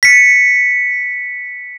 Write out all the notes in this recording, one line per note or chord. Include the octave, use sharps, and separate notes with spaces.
B6 C#7